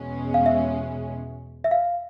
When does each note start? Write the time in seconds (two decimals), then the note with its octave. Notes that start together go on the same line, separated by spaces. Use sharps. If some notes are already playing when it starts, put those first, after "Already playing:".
Already playing: E2 B2 G#3 C#4
0.34 F5
0.46 E5
1.64 E5
1.71 F5